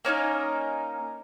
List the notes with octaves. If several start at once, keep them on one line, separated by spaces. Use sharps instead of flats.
A#3 C#4 D#4 A#4